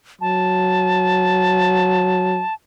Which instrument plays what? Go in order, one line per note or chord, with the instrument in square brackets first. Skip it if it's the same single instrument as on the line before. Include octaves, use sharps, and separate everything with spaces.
[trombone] F#3 [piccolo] A5